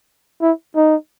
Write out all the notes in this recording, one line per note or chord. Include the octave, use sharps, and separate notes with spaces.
E4
D#4